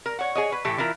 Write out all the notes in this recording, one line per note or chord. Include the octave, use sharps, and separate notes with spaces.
A#4
C#5 F#5
G#4 C#5 D#5
B4
A2 E3 G4 A4
E3 E4 F4 A#4